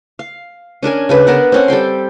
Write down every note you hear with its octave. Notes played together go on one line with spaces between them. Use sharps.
F5
C#4 D4 A#4 G#5
C#3 D4 B4
B3 D4 A#4 F#5
C4 C#4 F#5
G3 A4 G5 C6